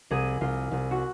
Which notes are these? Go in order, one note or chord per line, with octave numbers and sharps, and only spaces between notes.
C2 G#4
C2 F4
C2
F#4